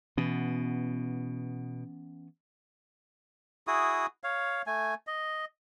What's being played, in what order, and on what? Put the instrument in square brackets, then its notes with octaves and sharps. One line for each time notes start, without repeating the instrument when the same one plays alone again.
[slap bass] B2 [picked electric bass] E3 B3 C#4
[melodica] E4 F#4 G#4 D#6
C#5 F5
A3 G#5
D#5